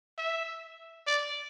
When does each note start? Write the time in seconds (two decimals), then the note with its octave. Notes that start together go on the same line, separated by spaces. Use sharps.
0.18 E5
1.07 D5